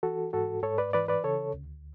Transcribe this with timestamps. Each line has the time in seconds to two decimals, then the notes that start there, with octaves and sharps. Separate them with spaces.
0.03 E3 F#4 A4
0.33 G#2 F#4 A4
0.63 G#2 A4 C#5
0.78 B4 D5
0.93 E3 B4 D5
1.08 B4 D5
1.24 C#3 A4 C#5
1.54 D2